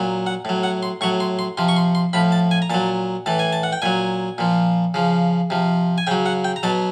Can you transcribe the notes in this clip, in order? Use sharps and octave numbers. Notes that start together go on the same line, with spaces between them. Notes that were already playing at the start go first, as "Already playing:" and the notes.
Already playing: A#2 F#3
F#5
A2 F#3
F#5
C6
A2 F#3 C#6
C6
C6
C3 F3 C6
C#6
C6
C6
A2 F3 B5
A5
G#5
A#5
A#2 F#3 A5
A2 E3 A5
G#5
A5
F#5
G5
A#2 F#3 G#5
A#2 F3
C#3 F3
C3 F3
G#5
C#3 F#3 G5
F#5
G5
A#5
B2 F#3 A5